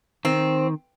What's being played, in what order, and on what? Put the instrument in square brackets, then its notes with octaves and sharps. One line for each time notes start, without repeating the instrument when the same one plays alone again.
[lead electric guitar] D#3 [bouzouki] C4